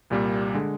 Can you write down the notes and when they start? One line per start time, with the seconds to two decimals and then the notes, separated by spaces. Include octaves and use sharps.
0.10 C2 A#2 G3 A#3
0.55 D3 G#3